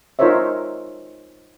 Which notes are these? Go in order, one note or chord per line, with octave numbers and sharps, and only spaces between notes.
D#4 F4 A#4 C5 C#5 E5